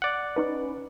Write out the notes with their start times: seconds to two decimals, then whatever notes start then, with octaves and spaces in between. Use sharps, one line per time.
0.02 D5 F#5
0.36 C#4 D#4 B4